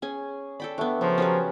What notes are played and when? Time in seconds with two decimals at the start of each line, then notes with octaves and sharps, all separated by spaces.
0.02 C#4 G#4 G#5
0.60 A4 D5 G5 B5
0.78 A3 B3 D4 C#5
1.01 C#3 F3 F#3 C5 B5
1.18 F#3 C#4 G4 G#4 A#4 B4